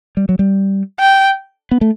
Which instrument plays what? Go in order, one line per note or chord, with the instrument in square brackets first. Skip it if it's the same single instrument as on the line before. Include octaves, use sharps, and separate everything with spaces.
[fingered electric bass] G3
F#3
G3
[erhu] G5
[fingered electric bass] B3
A3